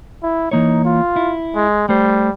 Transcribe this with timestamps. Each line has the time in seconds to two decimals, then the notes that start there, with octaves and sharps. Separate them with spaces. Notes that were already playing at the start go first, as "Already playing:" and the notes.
0.23 E4
0.51 E3 A#3 D#4 C#5
0.84 F4
1.16 E4
1.55 G#3
1.89 G3 A3 C5